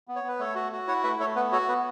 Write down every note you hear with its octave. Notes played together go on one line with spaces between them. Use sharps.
B3
C#5
B3 B4
A3 A4 C#5
F#4
F#4
E4 C#5 F#5
A3 B4 E5
A3 A4 C#5
B3 B4
F#4 A4 C#5
B3 B4